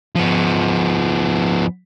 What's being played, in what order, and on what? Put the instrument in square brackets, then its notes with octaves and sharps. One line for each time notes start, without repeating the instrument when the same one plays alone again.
[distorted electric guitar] F3 B3